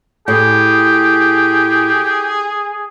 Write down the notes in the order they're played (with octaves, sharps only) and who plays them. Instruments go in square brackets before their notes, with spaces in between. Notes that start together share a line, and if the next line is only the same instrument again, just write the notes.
[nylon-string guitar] A2 [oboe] G4 [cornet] G#4